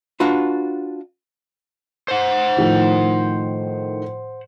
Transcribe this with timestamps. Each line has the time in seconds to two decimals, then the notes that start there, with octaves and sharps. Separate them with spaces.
0.20 D4 F4 F#4 B4
2.08 C5 F#5
2.57 A2 D#3 F3